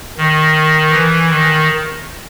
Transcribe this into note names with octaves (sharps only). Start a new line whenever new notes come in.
D#3
E3
D#3